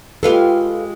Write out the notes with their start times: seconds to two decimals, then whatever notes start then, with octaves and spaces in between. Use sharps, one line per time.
0.23 G#3 F4 G4 A4 B4 F5